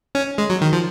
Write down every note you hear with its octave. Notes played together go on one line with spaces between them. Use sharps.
C#4
G#3
F#3
D#3
F3